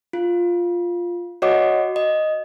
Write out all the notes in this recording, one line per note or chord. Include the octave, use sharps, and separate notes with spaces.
F4
F#4 C#5 D#5 F#5 D6
D#5